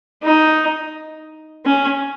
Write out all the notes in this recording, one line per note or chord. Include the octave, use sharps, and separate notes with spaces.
D#4
C#4